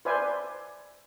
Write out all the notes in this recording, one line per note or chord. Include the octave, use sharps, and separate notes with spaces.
B4 C5 D5 E5 G#5